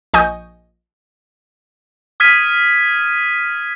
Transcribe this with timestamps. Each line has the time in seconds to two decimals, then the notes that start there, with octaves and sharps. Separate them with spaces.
0.14 A#1 D#5 G#5 C#6 D#6 G6
2.20 D#6 F6 G#6 B6 D#7